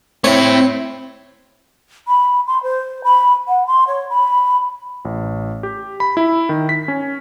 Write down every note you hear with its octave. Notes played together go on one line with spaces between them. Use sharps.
A3 C4 E4 C#5
B5
C6
C5
B5
F#5
C6
C#5
B5
A1
G4
B5
E4
D#3
B6
C#4